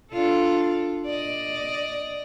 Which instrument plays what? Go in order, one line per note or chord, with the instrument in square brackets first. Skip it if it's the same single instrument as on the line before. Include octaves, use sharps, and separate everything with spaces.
[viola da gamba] D4 F4 A4
D5 D#5